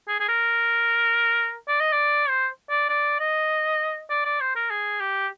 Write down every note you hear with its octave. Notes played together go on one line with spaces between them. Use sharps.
G#4
G#4
A#4
D5
D#5
D5
C5
D5
D5
D#5
D5
D5
C5
A#4
G#4
G4